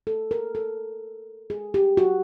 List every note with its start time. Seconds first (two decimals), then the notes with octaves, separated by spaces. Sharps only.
0.07 A4
0.31 A#4
0.55 A4
1.50 G#4
1.74 G4
1.97 F#4